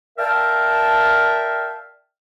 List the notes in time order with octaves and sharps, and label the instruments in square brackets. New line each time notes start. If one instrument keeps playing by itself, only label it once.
[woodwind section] A#4 D5 E5 F5 G5 A5